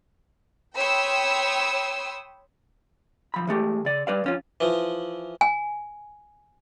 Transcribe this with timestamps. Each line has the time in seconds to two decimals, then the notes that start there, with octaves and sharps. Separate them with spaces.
0.75 C#5 G5 B5 C6 D#6 E6
3.34 B1 F3 B5
3.47 E3 G#3 A3 G4
3.85 C#3 D5
4.07 G3 B4 D5 F5
4.24 F2 C#4 F4
4.60 E3 F3
5.41 G#5